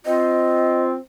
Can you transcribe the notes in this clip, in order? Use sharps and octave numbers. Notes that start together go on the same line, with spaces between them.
C4 F4 D#5